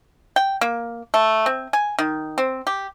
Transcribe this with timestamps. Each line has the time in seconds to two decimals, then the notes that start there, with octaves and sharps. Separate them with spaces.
0.36 G5
0.61 A#3
1.14 A3
1.46 C4
1.73 G#5
1.99 D#3
2.38 C4
2.67 G4